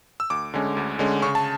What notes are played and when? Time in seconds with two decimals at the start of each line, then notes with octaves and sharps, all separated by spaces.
0.20 E6
0.30 D2 D6
0.54 D3 G#3 C#4
0.77 D2
0.99 D3 G#3 C#4
1.22 C#3 C#6
1.35 A5